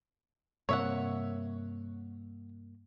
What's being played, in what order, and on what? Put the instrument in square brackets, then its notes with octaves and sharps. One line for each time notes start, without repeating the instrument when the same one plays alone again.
[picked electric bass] G2 C3 A#3 [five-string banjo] C#5 E5 F#5